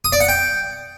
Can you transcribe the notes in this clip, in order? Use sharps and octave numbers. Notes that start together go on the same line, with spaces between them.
D#6
D5
F#5
G5